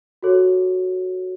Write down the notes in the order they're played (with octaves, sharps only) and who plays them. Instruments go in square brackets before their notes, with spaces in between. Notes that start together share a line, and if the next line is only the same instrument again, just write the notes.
[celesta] F#4 A4 C#5